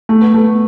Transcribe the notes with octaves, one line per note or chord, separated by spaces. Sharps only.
A3
B3
A3